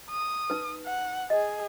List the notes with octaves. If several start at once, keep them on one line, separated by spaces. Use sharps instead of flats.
D#6
D#4 B4
F#5
G#4 D#5